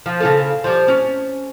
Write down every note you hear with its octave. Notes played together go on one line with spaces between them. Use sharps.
F3
C#3 F4 A4
F3 G3
C#4